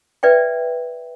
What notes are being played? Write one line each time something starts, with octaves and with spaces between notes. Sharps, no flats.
B4 D5 E5 G5